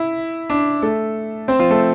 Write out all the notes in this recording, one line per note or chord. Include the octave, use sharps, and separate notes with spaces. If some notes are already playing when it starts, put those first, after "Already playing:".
Already playing: E4
D4
A3 A4
C4 C5
F3 F4
A3 A4